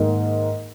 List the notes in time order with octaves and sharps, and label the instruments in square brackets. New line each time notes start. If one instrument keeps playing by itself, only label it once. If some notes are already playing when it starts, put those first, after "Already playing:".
Already playing: [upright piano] G#2 D#3 A#3